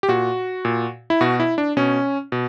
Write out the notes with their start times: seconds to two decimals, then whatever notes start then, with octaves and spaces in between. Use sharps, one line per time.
0.03 G4
0.08 A#2 F#4
0.65 A#2
1.10 E4
1.21 B2 F#4
1.40 E4
1.58 D4
1.77 B2 C#4
2.32 B2